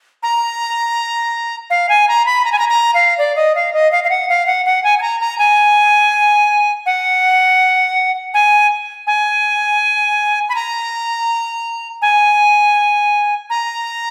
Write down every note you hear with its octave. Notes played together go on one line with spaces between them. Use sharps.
A#5
F5
G#5
A#5
B5
A#5
G#5
A#5
A#5
F5
D5
D#5
F5
D#5
F5
F5
F#5
F5
F#5
F#5
G#5
G#5
A#5
A#5
G#5
F#5
G#5
G#5
B5
A#5
G#5
A#5